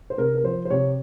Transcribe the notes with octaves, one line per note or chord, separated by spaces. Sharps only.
C5
C3 A#4
A#4
F3 C5
C5
C3 C#5